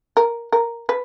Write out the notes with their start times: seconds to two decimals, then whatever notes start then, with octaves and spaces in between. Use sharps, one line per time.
0.17 A#4
0.52 A#4
0.89 B4